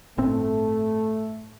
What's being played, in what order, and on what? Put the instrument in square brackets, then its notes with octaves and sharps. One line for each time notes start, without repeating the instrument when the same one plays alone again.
[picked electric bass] G1 A2 C4 [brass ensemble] A3